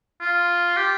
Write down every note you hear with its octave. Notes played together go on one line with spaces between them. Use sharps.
F4
G4